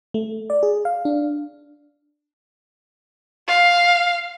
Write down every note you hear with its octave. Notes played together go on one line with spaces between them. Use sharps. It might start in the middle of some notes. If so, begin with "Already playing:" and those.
A3
D5
G#4
F5
D4
F5